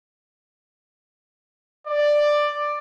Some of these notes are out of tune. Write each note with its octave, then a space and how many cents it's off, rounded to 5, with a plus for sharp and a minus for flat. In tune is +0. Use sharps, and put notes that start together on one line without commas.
D5 +10